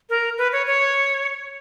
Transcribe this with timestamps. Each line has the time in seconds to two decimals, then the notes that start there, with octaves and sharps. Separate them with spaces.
0.10 A#4
0.38 B4
0.53 C#5
0.67 C#5